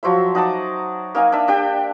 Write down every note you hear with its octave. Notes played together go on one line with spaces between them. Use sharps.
F3 F#3 C5 E5
D#4 F#5 A5 D6
A#3 D#4 F5 G#5
D4 E5
D4 G4 G5